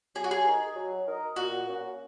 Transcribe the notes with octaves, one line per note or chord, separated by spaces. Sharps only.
F#3 G#4
F#4
G#4
D#4 A#4 D#5
F#3
D#4 A#4 D#5
A#2 F#4
A#3 C#4